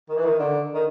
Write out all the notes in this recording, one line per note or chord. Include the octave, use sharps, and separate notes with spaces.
D#3
E3
D#3
D3
D#3